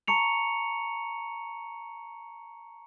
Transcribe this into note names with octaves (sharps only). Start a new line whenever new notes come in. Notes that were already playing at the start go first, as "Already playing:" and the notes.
A5 A#5 C#6 C#7 F7